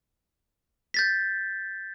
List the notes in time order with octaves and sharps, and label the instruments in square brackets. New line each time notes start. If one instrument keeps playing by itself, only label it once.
[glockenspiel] G6 A6 B6